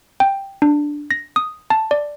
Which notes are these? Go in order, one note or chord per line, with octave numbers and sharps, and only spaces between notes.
G5
D4
A#6
D#6
A5
D5